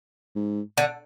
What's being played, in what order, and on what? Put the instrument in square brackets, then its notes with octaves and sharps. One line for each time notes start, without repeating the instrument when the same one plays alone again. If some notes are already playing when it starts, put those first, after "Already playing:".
[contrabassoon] G#2
[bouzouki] D3